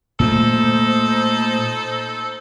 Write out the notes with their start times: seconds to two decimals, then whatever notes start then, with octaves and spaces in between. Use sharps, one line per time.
0.20 A#2 A3 D#4 A4 C5